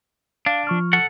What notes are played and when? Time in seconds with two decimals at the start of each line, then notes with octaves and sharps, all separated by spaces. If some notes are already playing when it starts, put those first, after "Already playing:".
0.46 D4 F5
0.67 F3 C#6 F6
0.93 A4 F#5